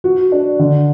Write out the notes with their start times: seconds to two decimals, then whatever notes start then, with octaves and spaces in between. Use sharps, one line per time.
0.04 F#4
0.32 D4
0.59 D3